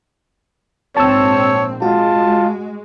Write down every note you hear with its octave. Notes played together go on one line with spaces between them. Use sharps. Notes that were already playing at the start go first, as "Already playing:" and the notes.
A#1 G#2 C4 C#5 A5 E6
G#3 F4 F#4 A5